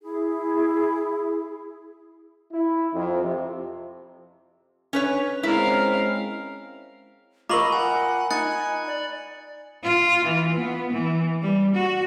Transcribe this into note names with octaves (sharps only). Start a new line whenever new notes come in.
E4 G#4
E4
F2
C3
C#4 B4 C#5
G#3 C4 C#4 E4 A#4 F5
F4 A#4 D#5 A#5 B5 C#6 D6 F#7
F#5 G#5
D#4 G#5 F#6 A6 C#7
D5
F4
E3
B3
E3
G3
F#4